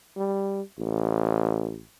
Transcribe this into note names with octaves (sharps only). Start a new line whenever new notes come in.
G3
A1